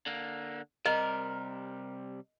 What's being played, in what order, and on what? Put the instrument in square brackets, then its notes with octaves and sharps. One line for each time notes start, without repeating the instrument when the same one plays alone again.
[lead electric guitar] D3 A#3
[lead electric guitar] C3 G3 [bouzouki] A#4 [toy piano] D#5